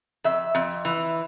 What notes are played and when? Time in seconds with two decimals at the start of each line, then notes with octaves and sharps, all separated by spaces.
0.24 F2 E5
0.55 F2
0.85 E3